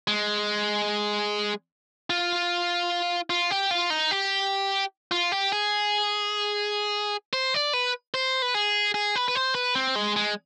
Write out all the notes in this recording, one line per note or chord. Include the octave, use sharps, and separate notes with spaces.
G#3
F4
F4
G4
F4
D#4
G4
F4
G4
G#4
C5
D5
B4
C5
B4
G#4
G#4
B4
B4
C5
B4
C4
G#3
G#3